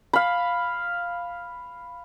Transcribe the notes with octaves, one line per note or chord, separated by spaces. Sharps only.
F5 B5